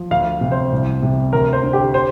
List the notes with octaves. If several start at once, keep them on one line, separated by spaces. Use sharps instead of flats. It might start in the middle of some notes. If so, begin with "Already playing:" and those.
Already playing: F3
D2 F5
C3
C5
C2
C3
D2 A#4
C5
D3
G4
C5